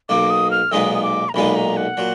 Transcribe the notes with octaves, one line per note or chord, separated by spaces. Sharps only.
B1 B2 A#3 D6
D#6
F6
B1 A#2 G#3 B3 D#4 D#6
D#6
D6
A#5
B1 A#2 G#3 B3 D#4 B5
A#5
F#5
A#2 F#3